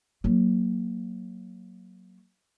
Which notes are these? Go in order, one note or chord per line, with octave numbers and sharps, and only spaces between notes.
F#3 A#3